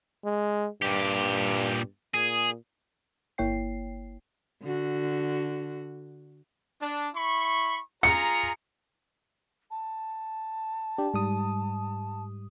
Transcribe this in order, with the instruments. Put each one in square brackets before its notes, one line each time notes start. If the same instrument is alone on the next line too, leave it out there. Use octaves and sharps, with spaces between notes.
[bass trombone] G#3
[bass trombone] G2 [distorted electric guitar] A#2 G4
[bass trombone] A#2 [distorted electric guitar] G#4
[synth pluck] G1 A#3 E4 C#5 G5 C7
[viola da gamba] D3 F#4
[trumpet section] D4
E4 B5 C#6
[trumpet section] F4 G#4 A#5 [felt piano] C#7
[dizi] A5
[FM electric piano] D4 G4
G#2 G3 D#6